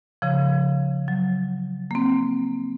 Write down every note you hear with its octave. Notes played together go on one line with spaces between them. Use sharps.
C#3 F3
F#3
A#3 C4